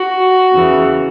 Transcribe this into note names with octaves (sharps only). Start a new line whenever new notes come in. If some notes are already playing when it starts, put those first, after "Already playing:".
Already playing: F#4
E2 C#3 E3